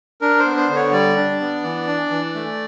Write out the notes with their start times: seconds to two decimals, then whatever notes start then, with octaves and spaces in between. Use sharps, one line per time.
0.21 D4 A#4
0.39 C5
0.45 B3
0.57 C5
0.69 D3
0.75 C#5
0.92 G3 D5
1.17 D4
1.40 B3
1.63 E3
1.87 D4
2.11 E3
2.35 A3